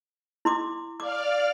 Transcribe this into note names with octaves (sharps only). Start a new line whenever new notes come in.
E4 C6 D6
D5 F5 D6 F6